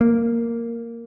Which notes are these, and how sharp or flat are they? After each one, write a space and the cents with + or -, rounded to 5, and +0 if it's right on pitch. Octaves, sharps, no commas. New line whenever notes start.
A#3 -5